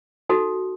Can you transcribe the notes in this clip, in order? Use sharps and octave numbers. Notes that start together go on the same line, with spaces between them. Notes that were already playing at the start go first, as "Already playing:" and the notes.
D#4 F#4 A4